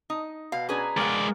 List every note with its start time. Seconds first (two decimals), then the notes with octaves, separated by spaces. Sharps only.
0.10 D#4
0.52 B2 F5
0.69 C#4 D4 G#4 B4 G#5 A#5
0.97 G#3 A#4 D5 F5 F#5